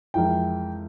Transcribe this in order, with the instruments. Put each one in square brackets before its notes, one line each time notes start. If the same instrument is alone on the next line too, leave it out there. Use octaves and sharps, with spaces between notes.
[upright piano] F2 E3 G#3 E4 A#4 [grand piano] G5